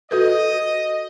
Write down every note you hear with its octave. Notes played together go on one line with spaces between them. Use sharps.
F#4 A4 B4 D#5